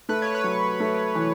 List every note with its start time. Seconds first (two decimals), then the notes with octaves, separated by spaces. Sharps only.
0.09 A3 B4
0.22 C#5
0.35 B4
0.44 F#3
0.80 A3
1.15 E3